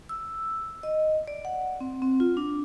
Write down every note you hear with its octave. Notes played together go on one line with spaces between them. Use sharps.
E6
D#5
D5
F#5
C4
C4
F4
D4